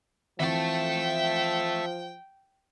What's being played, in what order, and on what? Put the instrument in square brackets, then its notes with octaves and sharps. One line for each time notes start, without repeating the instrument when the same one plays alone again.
[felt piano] E3 C4 [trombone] F3 [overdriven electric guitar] E5 A5 [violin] G5